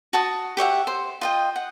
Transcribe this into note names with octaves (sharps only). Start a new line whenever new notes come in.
F#4 A5 D#6
G4 C#5 E5 F#5
C5
F4 D#5 G5
F#5